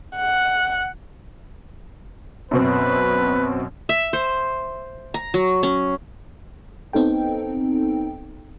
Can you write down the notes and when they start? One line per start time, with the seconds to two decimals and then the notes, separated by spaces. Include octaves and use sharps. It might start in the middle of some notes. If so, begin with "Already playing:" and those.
0.16 F#5
2.51 F#2 B2 C4 B4
3.89 E5
4.13 C5
5.14 A#5
5.34 F#3
5.63 C#4
6.93 B3 C4 D#4 A4 G5